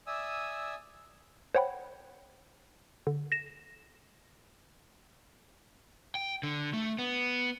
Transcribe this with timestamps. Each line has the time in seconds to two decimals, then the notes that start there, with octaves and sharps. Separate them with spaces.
0.07 D5 E5 G#5 D#6 E6
1.55 C5 C#5 F#5 G5 B5
3.07 D3
3.32 A#6 E7
6.15 G5
6.43 D3
6.74 A3
6.99 B3